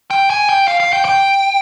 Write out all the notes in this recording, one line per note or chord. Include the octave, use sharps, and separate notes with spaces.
G5
G#5
G5
F5
F5
G5
G5